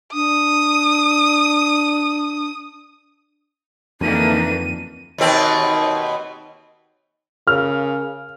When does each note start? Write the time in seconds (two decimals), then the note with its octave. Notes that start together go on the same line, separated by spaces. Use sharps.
0.13 D4 D#6
4.01 F2 D3 E3 A#3 D#4 D#7
5.18 D#2 B2 C4
7.47 C#3 G#4 A#4 F5 F6